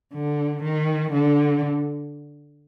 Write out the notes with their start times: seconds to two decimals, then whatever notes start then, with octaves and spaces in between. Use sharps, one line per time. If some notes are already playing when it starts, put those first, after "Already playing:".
0.14 D3
0.63 D#3
1.12 D3